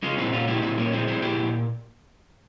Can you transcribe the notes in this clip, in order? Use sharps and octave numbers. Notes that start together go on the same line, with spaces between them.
G#3 C#4 F4
A#2 C4 E4
A#2 C#4 F4
G#3 E4 G4
A#2 C4 E4
A#2 A#3 C#4
G#3 C4 E4
G#3 C4 E4
A#2 E4 G4
A#2